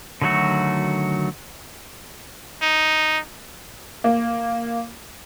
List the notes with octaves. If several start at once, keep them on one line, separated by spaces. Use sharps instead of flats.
D3 D#3 F#3 A3 F#4
D#4
A#3